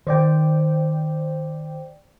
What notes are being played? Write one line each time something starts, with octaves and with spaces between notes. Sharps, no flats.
D#3 C5 D5 G5